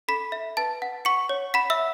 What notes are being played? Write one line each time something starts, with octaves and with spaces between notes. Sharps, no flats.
A4 B5 B6
E5
B4 A5 A6
F#5
F#5 C#6 C#7
C#5
F#5 B5 B6
E5 E6